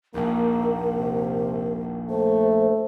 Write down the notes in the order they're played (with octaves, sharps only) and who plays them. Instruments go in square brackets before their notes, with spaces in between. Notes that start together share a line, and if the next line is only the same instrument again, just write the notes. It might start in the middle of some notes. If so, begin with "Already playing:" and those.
[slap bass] A#1 D#2 [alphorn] A#3 [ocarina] A#4
[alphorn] C3
[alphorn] A3 [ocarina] C5